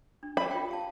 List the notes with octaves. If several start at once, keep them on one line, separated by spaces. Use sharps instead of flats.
D4
B5
F4 G5
G4 F5 A5